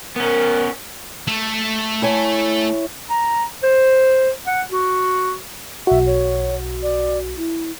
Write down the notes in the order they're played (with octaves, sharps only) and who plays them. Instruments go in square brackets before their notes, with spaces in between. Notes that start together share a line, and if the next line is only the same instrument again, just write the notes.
[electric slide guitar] B3 C#4 [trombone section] A#4
[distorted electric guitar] A3
[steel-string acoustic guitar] E4 C#5 G#5
[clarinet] A#5
C5
F#5
F#4
[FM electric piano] B1 F#4 [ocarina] E5
[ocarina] C#5
D5
E4